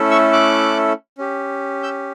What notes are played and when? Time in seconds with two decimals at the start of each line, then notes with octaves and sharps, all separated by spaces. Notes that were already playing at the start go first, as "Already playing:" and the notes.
Already playing: A3 C#4 E4 A4
0.11 C#6 E6
0.33 D6 F#6
1.18 C#4 G4
1.83 E6 G6